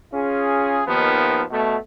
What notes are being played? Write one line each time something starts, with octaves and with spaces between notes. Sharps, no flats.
C#4 F4 G#4
D#2 D#3 F3 B3
B2 A3